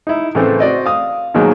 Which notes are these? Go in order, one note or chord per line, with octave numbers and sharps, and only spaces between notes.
D#4 E4
A2 C#3 E3 A3 C4
C4 F#4 D5 D#5
F5 D#6
G#2 B2 D#3 F#3 G#3 A#3